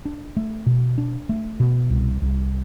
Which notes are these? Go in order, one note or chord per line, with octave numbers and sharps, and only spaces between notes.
D4
A3
B2
D4
A3
B2
C2
C2